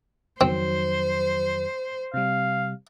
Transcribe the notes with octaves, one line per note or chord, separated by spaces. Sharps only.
F2 D#3 F#3 C4 C5
C3 G3 F5